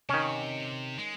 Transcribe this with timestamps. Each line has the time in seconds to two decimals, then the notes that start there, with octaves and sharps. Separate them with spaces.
0.09 C3 D#3 C#4
0.98 G#3